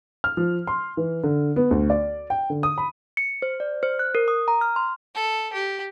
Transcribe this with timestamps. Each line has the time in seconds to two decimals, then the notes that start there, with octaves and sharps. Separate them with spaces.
0.24 F6
0.37 F3
0.67 C6
0.97 E3
1.24 D3
1.56 B3
1.71 D2
1.90 D5
2.30 G5
2.50 D3
2.63 D#6
2.78 B5
3.17 C#7
3.42 C5
3.60 D5
3.83 C5
3.99 F#6
4.15 A#4
4.28 D#6
4.48 A#5
4.61 F6
4.76 C6
5.15 A4
5.53 G4